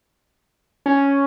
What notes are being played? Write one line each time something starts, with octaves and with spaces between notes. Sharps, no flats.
C#4